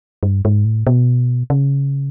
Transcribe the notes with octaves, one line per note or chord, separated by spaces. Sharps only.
G2
G#2
A2
B2
C#3